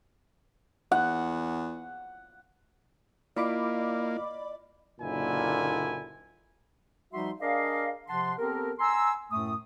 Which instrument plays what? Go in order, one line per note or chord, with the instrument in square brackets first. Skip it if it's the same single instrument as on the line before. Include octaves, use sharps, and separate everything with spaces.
[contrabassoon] E2 [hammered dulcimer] F#5
[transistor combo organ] A#3 [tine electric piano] E4 F4 F5 [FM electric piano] D5 B5 D6 [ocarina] D#5
[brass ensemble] F#1 A#2 D3 D#4 E4 G#5
[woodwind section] F3 G3 D#4 F#4 E5 C6
D4 G#4 A#4 D5 D#5 F5
C3 F3 F#5 A5 C6
B3 C4 G4 A4 A#4
G#5 A#5 C6 E6
F#2 A2 A3 D#6